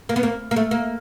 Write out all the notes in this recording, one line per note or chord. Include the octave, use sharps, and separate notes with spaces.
A#3
B3
A#3
A#3
A3
A#3